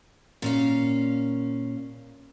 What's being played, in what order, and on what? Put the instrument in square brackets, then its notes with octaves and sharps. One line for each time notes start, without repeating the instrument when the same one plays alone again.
[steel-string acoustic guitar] A#2 C#4 F5